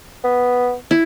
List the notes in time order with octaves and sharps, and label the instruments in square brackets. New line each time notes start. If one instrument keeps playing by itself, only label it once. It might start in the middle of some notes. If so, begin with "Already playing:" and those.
[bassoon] B3
[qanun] E4